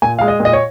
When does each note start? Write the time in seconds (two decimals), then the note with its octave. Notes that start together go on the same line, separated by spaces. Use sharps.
0.02 A#2 G#5
0.19 G#3 F5
0.28 D#5
0.40 A#2
0.45 D#5
0.53 C#5